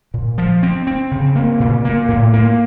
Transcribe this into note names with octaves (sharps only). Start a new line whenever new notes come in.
A#2
F3
C4
C4
C#3
A#3
A#2
A#3
A2
A#3